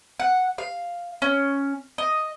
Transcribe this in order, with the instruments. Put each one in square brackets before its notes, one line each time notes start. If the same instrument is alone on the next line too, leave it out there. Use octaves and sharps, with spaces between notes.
[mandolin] F#5
F5
C#4
D#5